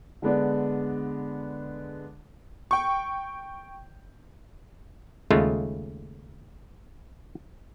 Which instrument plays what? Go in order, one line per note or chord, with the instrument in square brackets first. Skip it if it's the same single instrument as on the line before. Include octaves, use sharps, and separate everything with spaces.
[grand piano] D3 G#3 B3 D4
[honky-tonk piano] G5 C#6
[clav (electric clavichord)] D#2 C#3 G#3 A3 F4